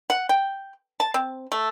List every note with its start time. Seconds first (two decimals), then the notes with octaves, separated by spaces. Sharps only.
0.10 F#5
0.29 G5
1.00 A5
1.14 C4
1.52 A3